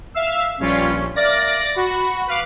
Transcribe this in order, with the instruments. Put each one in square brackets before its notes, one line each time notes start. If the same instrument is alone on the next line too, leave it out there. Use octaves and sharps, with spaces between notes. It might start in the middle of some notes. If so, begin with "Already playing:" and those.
[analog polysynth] E5 F5 E6
[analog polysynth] A#1 G3 F4 [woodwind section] G2 C#4
[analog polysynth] A#1
[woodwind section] A#3 E5 F6 [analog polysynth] D5 A6 A#6
[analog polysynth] F#4 [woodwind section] B5
[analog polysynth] B4 F5 D6